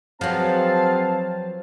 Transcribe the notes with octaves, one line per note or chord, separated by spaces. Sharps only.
F3 F#3 C4 G#4 B4 F5 A5